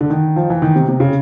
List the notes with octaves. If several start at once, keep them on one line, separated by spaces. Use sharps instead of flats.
D3
D#3
F3
E3
D#3
C3
C3
C#3